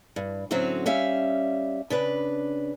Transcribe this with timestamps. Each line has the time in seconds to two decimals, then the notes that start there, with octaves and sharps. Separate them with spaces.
0.16 G2
0.51 A2 D3 F#3 C4 C#4 F#4
0.86 G3 C#4 E5 F5
1.90 C#3 D4 B4